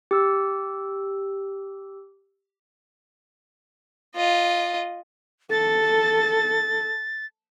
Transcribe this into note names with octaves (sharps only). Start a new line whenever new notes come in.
G4 E6
F4 D#5
A4 A6